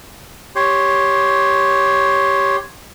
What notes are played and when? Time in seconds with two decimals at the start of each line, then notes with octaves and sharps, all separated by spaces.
0.56 G4 C#5 C6